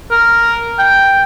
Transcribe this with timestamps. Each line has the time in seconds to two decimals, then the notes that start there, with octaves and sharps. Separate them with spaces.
0.11 A#4
0.79 G5